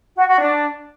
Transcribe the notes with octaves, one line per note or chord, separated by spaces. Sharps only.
F#4
F#4
D4